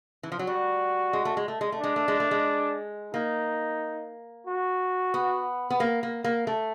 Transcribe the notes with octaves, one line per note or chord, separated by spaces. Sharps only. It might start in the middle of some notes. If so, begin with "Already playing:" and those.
E3
F3
F#3
G3 F#4
G#3
A3
G#3
A3
G#3
A3
G#3 D4
A3
G#3
A3
G#3
A#3 D#4
F#4
B3
B3
A#3
A#3
A#3
A3